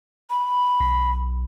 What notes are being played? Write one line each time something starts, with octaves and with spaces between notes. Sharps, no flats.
B5
B1